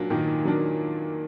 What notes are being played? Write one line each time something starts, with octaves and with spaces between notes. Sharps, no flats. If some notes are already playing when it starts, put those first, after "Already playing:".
Already playing: A#2 F#3 A#3 D4
A#2 D#3
F#3 A#3 D4